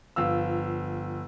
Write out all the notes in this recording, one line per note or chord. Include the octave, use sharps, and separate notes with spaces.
G1 F3 F5 E6